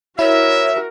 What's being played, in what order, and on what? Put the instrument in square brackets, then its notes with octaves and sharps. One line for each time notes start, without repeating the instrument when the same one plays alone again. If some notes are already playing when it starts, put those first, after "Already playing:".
[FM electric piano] E4 [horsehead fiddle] F#4 A#4 [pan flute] C#5 [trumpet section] E5